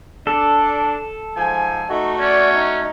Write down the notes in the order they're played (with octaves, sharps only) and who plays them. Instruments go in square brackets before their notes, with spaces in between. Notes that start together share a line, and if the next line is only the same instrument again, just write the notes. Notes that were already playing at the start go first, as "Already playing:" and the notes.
[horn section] D4 [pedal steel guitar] A4
[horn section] G#2 F3 G#5
[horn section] A3 F#4 [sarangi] D#4
[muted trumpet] C#4 [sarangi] D5
[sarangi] D#4